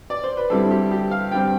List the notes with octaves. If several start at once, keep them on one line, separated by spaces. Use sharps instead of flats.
D5
C5
B4
G2 D3 G3 C4 E4 A4
G4
G4
F5
G2 D3 G3 C4 G5